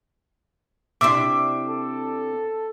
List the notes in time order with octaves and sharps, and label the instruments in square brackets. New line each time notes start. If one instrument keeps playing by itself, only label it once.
[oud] C3 D4 E4 [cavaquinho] C5 E5 [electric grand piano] D6
[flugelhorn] A4